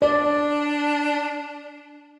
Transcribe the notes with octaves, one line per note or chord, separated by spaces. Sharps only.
D4 D5